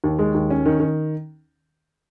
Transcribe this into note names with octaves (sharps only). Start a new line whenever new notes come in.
D#2
G#3
D#2
C#4
D#3
D#3